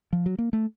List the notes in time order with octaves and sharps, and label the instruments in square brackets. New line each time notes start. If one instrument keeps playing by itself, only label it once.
[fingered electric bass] F3
F#3
A#3
A3